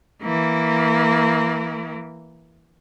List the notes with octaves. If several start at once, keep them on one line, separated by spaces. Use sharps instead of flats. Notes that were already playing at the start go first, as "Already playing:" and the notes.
E3 A#3